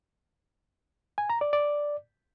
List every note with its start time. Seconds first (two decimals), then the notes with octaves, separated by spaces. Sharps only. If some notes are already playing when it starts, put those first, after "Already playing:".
1.18 G#5
1.30 A#5
1.41 D5
1.53 D5